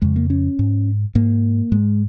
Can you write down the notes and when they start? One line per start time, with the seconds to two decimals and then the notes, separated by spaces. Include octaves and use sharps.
0.02 F2 C#3 G#3
0.16 A#3
0.30 C#4
0.59 G#2
1.15 G#2 A#3
1.72 G#2 G#3